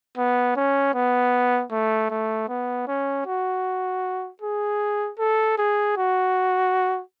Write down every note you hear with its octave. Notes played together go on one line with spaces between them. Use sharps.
B3
C#4
B3
A3
A3
B3
C#4
F#4
G#4
A4
G#4
F#4